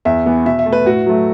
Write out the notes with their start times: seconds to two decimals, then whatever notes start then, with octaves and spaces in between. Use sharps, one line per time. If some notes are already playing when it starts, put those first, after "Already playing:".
0.05 E2 E5
0.26 E3 B3
0.46 B2 E5
0.59 E5
0.66 A3
0.72 B4
0.86 A2 F#4
1.06 F#3 A3